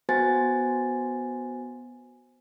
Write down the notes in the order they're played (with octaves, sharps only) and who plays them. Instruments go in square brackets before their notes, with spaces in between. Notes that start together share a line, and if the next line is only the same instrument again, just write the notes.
[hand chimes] B3 F#4 C5 G#5 A6